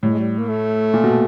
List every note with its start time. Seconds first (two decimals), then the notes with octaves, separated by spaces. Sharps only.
0.03 A2 G3
0.11 G#3
0.19 G3
0.38 A#3
0.48 A3
0.94 A#2
1.04 B2